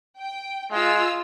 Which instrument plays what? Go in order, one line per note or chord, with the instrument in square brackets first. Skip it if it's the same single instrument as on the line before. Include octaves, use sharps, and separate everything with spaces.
[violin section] G5
[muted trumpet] G#3 [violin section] F4 E6